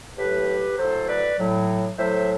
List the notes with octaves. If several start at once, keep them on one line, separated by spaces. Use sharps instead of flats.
A2 F#3 G4 B4
A2 F#3 A4 C5
B4 D5
A2 F#3
A2 F#3 C5 E5